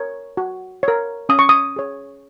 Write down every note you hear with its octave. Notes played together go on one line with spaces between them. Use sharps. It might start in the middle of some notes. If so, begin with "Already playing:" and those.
Already playing: A#4 C#5
F#4
A#4 C#5
C#4 D#6
C#6
D#6
G#4 C#5